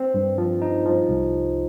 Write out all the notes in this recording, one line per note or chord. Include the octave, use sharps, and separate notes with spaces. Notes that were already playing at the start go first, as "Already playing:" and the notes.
Already playing: C4
G2
F3
D#4
F3
C2